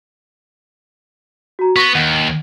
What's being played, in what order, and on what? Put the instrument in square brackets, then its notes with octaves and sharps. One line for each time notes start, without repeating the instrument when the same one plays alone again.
[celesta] F#4 A#5
[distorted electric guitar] B3 [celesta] C#6 A#6
[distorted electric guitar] D#2 [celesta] F#5 A6